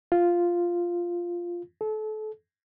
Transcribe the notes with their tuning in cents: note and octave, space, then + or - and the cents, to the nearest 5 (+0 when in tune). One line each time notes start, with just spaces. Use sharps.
F4 -5
A4 -30